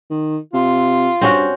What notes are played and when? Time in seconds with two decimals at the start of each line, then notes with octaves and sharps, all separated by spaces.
0.11 D#3
0.53 C3 F4
1.21 G2 C4 C#4 F#4